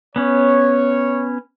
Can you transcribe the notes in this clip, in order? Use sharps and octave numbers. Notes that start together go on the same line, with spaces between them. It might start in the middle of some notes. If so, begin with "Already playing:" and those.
B3 C#4 C#5